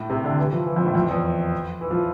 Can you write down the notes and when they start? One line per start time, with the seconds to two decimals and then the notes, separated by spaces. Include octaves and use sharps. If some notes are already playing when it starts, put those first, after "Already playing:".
Already playing: A2
0.10 C3
0.24 D3
0.38 E3
0.53 F3
0.66 E3
0.76 F2
0.86 A2
0.95 F2
1.09 E2
1.81 E3
1.91 F3